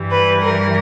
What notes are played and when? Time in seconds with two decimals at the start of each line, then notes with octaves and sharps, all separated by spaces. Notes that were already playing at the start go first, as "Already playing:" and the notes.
Already playing: G2 E3 G3
0.11 B4
0.41 A#4